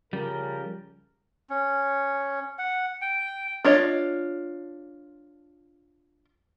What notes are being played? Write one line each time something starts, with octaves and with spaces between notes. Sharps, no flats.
C#3 F3 G3 A#4
C#4
F#5
G5
D4 F4 C#5 D#5